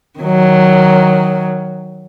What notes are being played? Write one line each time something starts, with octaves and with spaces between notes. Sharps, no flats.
D#3 F#3